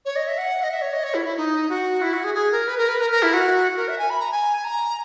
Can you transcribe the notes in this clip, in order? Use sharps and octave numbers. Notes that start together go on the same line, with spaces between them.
C#5
D#5
E5
F#5
D#5
E5
C#5
D#5
C#5
E4
E4
D#4
F#4
E4
F#4
G#4
G#4
A#4
B4
A#4
B4
A#4
A#4
E4
F#4
A#4
E5
G#5
B5
A#5
G#5
G#5
A#5